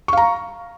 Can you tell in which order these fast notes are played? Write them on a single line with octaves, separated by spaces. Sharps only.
C#6 F5 A#5